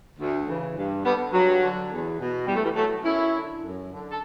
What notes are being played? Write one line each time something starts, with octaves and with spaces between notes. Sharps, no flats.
D2
C#3 E3
G2
D3 G3 B3
G2 F#3
D3
E2
B2
E2 G3
A3
E3 G3
B2 F#3 A3
F#2 C#4 E4
D3
F#2
D3
A4